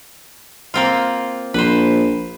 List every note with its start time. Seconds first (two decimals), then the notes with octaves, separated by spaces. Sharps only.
0.74 A#3 C4 F4
1.54 A#1 B4 C5